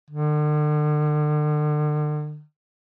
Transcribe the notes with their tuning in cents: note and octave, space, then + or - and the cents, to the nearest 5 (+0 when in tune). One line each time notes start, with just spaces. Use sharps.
D3 +40